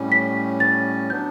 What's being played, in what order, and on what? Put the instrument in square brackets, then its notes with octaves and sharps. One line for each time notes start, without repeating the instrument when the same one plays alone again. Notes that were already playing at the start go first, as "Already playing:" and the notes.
Already playing: [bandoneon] A2 G3 C#4
[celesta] B6
A6
[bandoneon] F#3 B3 D4 [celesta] G6